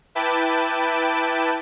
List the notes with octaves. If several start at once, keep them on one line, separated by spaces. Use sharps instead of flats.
E4 B4 G5 A5 D6